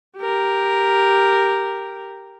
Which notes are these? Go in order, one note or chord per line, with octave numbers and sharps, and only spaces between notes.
G4 A#4